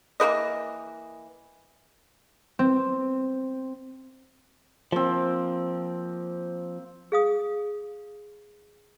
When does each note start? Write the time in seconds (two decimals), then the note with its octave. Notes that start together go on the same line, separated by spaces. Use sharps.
0.20 E3 A#3 B4 D#5
2.59 C4
4.92 F3 A#3 C4
7.12 G#4 F5 D#6